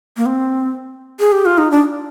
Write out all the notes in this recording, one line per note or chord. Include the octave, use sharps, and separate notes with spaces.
A#3
C4
G#4
G4
F4
D#4
D4